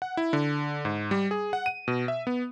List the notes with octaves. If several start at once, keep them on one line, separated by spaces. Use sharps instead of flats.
F#5
E4
D3
G#2
G3
G#4
F#5
D#7
B2
E5
B3